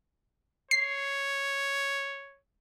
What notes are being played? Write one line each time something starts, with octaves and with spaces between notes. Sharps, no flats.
C#5 C7